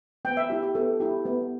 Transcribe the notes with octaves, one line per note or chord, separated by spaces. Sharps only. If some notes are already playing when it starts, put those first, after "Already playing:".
B3 G5
E5
E4 G4
G4
B3 A4
E4 G4
B3